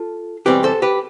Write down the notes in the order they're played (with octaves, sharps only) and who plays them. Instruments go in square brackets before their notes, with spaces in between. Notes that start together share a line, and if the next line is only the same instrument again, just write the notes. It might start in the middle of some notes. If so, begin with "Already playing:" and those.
Already playing: [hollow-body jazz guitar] F4 A4
E2 B2 G3 C4 G4 B4
A4 C5
G4 B4